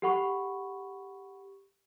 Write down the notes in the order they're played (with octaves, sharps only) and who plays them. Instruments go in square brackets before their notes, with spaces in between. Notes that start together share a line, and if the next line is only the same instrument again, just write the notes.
[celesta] G4 A4 F#5 B5 C#6